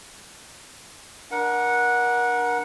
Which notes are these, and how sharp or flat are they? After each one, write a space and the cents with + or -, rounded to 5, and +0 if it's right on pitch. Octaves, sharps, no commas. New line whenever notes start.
D4 +0 A#4 +30 F#5 -10